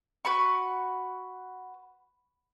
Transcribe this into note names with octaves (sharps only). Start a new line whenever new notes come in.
F#4 B4 B5 C#6